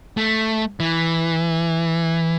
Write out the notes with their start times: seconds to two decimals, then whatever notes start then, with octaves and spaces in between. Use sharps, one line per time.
0.17 A3
0.80 E3